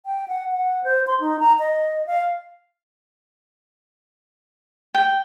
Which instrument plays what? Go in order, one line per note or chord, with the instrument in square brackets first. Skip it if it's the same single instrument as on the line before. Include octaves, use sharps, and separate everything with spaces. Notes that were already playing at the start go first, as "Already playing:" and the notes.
[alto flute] G5
F#5
F#5
C5
C6
D#4
A#5
D#5
F5
[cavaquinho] G5